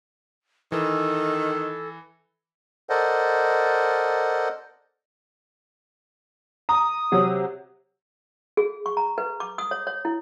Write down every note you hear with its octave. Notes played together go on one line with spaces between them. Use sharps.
D#3 E3 A4
A4 A#4 C5 D5 D#5 F#5
A#5 D#6
C3 F#3
G#4
C#6
A#5
B4
D6
D#6
C#5
C#5
E4